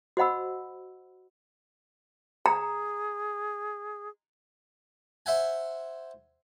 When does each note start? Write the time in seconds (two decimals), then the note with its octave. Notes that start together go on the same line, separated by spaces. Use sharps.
0.17 F#4 C5 D#5 F#5 B5 E6
2.46 G#4 A#5
5.26 C5 E5 F#5 G#5